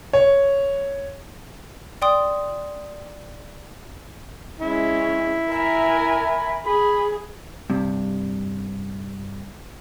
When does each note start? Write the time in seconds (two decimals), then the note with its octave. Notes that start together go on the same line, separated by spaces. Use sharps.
0.13 C#5
2.02 D5 G5 C6 D#6
4.60 G#3 C#4 E4
5.51 A#4 E5 G#5 B5
6.66 G#4 B5
7.70 G2 C3